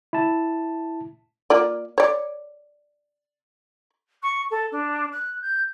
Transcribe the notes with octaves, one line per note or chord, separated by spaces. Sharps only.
E4 A5
A#3 F4 D5
C#5 D5
C#6
A4
D4
F#6
G6